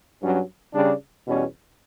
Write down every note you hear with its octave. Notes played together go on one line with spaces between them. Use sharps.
G2 F#3 C#4
C#3 G3 D4
E2 B2 G3 C#4